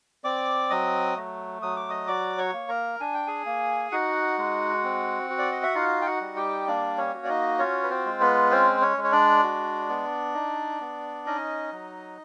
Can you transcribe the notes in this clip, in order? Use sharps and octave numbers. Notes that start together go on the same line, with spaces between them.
C4 D5 D6
F#3 D#5 D#6
A3
F#3 D#6
D6
D#5 D#6
F#4 D5 D6
C#5 C#6
A#3
A#4 A#5
D4 G#5
G5
G#4 G#5
A#3
D#4 F#4 F#5
G#3
C4
F#4
D5
D#5
E5
D#4 F4 F5
G5
F#4 F#5
G3
G4 G5
A#3 D4 D5
C#4 C#5
F#4
D5
D#4 D#5
C#4 F4 C#5
B4
C4 C5
G#3
B3 B4
C4 C#4 C5
C#4 C#5
G#3
C#5
D4 D5
F#4
B3
D#4
B3
C#4 D#4 D#5
F#3